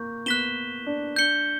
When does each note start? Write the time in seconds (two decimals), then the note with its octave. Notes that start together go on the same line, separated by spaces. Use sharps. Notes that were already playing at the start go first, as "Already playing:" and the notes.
Already playing: A#3 C#6 G6
0.26 B3 F#6 B6 E7 G7
0.86 D4
1.16 D4 G6 C#7 G7